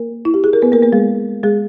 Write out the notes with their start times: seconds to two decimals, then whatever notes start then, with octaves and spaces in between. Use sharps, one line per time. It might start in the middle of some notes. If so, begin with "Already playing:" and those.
Already playing: A#3 A#4
0.25 E4
0.34 G4
0.44 G#4
0.53 A#4
0.62 B3 B4
0.72 A#3 A#4
0.82 A#3 A#4
0.93 G#3 G#4
1.43 G#3 G#4